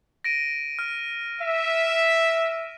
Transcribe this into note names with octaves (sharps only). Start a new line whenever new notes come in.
A#6 D7 D#7
F6
E5